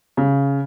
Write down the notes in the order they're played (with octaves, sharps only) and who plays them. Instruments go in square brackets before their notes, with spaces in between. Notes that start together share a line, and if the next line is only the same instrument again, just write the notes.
[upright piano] C#3